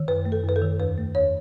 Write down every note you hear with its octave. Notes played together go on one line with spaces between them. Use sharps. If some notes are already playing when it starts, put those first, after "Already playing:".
Already playing: D#3
F#2 B4
A3
A4
F#2 B4
A4
D#3
E2 B4
A3
E2 C#5